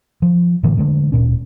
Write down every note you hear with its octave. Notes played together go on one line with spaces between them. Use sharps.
F3
A2 D3 E3 A3
D3 F3 G#3 A3
D1 A#2 C#4